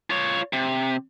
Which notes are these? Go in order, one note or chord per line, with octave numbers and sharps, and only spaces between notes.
F4 C#5
C3